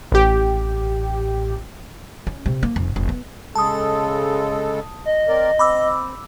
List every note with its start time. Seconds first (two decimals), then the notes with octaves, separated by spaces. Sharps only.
0.12 A1 G4
2.27 C#4
2.46 C3
2.63 A#3
2.76 F1
2.96 F1
3.09 B3
3.56 C#3 G#3 A4 A5 D#6
5.05 D#5
5.28 C4 A#4 D5
5.59 C4 B5 D6 E6